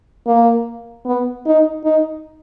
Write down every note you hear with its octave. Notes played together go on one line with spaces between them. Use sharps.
A#3
B3
D#4
D#4